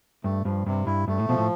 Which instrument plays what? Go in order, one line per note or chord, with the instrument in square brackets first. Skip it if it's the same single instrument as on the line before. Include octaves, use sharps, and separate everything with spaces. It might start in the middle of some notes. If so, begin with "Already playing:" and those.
[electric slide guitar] G2 [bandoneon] A3
[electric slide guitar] G2 [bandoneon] F3
[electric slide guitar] G2 [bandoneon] C3
[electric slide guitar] G2 [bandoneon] E4
[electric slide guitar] G2 [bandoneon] A3
[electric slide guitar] A2
[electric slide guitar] B2 [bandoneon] F3
[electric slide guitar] A2